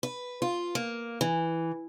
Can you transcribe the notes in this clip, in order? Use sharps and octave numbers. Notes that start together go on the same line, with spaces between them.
B4
F4
A#3
E3